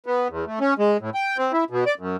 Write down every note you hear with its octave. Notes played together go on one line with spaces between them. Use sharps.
B3
E2
A3
C#4
G#3
A2
G5
C4
E4
B2
D5
F#2